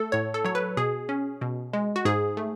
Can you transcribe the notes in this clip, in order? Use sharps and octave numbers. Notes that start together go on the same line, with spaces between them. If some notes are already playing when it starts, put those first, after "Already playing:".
Already playing: A3 A4
A2 C#5
A4
F#3 C#5
B4
B2 G#4
C#4
B2
G#3
F#4
G#2 G#4
A3